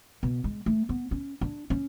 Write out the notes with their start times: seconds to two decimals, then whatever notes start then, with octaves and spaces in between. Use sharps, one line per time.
0.23 B2
0.44 G#3
0.66 A3
0.89 B3
1.11 C#4
1.41 D4
1.70 C#4